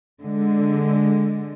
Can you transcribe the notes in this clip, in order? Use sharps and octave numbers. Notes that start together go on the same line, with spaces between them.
D3 G#3